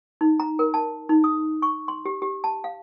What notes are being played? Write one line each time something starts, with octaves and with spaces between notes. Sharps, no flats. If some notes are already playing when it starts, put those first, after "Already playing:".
D#4
A#5
A#4
A5
D#4
D#6
C#6
C6
G4
G4
A5
F5